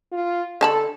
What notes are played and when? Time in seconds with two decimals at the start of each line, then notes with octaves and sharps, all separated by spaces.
0.12 F4
0.61 D3 A4 A5 B5